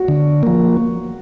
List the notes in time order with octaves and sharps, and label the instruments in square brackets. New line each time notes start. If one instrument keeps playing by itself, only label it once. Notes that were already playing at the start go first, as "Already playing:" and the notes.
Already playing: [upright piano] F#4
[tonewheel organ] D3
F3 A#3